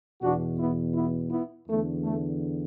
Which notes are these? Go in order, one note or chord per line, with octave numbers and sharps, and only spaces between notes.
E2 B2 D4 F#4
B3 E4
B3 E4
B3 E4
E2 D3 A3
A3